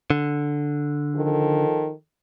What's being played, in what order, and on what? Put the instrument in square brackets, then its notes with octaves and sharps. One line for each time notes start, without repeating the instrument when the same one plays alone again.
[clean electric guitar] D3
[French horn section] D#3 F3 A4